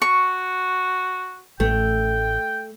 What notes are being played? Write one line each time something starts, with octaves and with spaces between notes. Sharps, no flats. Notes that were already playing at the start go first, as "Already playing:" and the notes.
F#4 C#6
A1 A3 G5